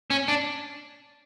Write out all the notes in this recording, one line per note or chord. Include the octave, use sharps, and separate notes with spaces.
C#4
D4